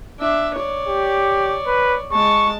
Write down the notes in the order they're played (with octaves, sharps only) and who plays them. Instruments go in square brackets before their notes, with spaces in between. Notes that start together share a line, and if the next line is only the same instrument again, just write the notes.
[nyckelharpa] D4 E5
C#5 D5
[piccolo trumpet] G4
B4
[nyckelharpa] G#3 A5 [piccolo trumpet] C#6